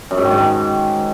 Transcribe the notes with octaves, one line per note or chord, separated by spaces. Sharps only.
F#2
G#2
D#3
G#2
D#3